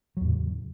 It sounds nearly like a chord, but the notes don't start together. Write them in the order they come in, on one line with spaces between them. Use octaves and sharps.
F#3 E2 A2 C#3